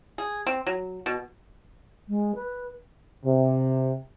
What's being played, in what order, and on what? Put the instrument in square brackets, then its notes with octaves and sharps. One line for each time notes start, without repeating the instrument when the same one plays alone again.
[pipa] G#4
C4
F#3
B2
[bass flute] G#3
B4
[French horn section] C3